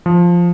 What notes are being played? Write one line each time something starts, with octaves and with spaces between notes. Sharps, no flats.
F3